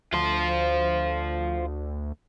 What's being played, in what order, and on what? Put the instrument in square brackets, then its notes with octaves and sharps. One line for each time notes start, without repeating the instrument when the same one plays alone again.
[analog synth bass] D2 [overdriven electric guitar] F4 C5